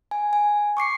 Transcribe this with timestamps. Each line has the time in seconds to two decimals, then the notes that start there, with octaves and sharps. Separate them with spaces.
0.11 G#5
0.33 G#5
0.77 C#6 D6 C7 C#7